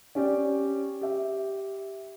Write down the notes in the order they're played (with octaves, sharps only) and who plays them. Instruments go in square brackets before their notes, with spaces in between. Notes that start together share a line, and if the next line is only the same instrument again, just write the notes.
[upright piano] C#4 G4 D5
G4 E5